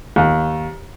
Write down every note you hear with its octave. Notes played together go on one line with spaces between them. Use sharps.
D#2